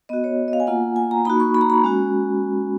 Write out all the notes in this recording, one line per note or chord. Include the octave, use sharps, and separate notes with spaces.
B3 F#4 D#5
C#5
D#5
F5
G#5
A#3 F4 F#5
G#5
A#5
A#3 D#4 F#4 B5
C#6
B5
A#5
B5
G#3 C#4 F#4